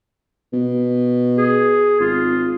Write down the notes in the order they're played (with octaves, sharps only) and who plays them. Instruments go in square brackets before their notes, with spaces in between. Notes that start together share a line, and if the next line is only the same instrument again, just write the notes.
[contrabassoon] B2
[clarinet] G#4
[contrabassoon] G#1 [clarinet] F4